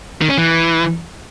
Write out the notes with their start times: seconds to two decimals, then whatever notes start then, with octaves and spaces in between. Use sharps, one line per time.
0.21 D#3
0.30 C#4
0.38 E3